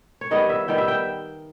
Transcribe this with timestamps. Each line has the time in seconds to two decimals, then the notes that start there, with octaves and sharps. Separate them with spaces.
0.21 C#5
0.31 D#3 G3 B3 D#5
0.49 E5
0.68 D#3 G3 B3 G5
0.78 E5
0.88 G5